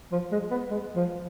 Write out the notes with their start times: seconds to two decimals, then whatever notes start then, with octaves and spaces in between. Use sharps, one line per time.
0.12 F3
0.32 G#3
0.51 B3
0.71 G#3
0.96 F3